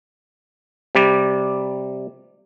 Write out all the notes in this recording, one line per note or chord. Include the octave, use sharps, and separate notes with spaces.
C3 G3 D5